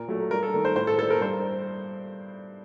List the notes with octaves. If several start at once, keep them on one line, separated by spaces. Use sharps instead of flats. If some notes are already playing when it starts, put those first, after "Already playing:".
Already playing: A#2 A#4
F#3 A3
G2 A#4
A4
D#3 A3
C5
A2 C5
A4
G3 A#3 A4
A#4
G2 C5